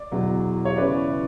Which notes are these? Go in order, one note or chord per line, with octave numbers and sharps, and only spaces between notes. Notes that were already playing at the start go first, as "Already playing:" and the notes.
Already playing: D5
E2 B2 F#3
C#5
C#3 E3 B4 D5